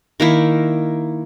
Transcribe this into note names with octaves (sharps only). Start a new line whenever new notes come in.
D#3 A#3 E4